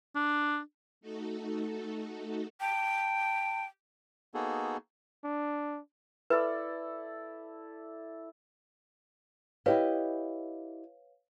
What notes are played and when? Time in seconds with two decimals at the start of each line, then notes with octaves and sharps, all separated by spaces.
0.15 D4
1.01 A3 D#4 F#4 A4
2.60 G5 A5
4.34 A#3 B3 D#4 F#4 G#4 A4
5.24 D4
6.30 E4 A4 B4 D5
9.66 E4 G4 B4 C#5 D#5 F5